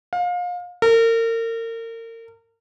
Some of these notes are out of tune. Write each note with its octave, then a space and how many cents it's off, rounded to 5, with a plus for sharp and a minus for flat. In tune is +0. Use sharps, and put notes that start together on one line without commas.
F5 +30
A#4 -35